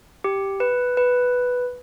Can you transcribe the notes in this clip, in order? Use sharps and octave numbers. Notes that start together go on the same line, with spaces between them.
G4
B4
B4